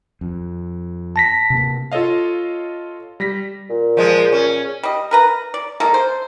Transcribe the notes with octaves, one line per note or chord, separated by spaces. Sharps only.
F2
A5 A#6 B6
C3 A#3
F4 A4 C#5 D#5 F5
G3 A#6 B6
A#2
F3 G#3
C#4
G3 D#5
A#4 B4 A#5
D5
G#3 A#3 A4
C5